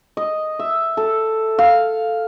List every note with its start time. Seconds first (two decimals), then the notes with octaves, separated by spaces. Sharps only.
0.17 D#5
0.59 E5
0.97 A4
1.59 F5